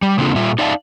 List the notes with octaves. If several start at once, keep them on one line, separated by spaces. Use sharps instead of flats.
G3
C#3 A#3 C4 D4 F4 A4
A#2 G3 F4 E5
D#4 D5 E5 F5 G#5 A5